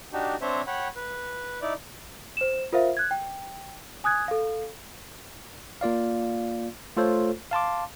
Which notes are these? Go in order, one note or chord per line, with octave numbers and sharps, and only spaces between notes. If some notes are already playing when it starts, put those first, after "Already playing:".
D4 D#4 F#4 G4
C4 D4 C5 C#5 E5
C#5 F#5 G5 B5
B4
D#4 E4 D5
C5 E7
F4 A#4 C5 E5 F5
F#6 G#6
G5
G#5 D#6 F#6 G#6
A4 F5
A#3 F4 D5 F5
A3 F4 A4 C5 C#5
F5 A5 C6 D6